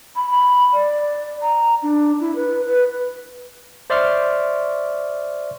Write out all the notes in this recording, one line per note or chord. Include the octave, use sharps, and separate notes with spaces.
B5
B5
D5
A#5
D4
E4
B4
B4
C5 D5 E5 C6 C#6 F6